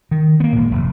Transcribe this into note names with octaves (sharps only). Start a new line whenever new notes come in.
D#3
A#3 B3
G#1 A#2
F1